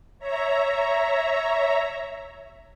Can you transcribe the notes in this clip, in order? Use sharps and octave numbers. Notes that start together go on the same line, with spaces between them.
C#5 E5 A#5